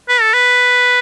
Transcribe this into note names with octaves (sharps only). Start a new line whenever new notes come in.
B4
A4
B4